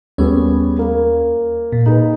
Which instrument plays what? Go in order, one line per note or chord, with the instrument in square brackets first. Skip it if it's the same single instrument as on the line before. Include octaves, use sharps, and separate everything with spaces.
[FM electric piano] D#2 C#4 C#5 [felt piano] G3 B3 G#4
[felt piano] A#3
[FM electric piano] A#2
[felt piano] D#4 G#4 B4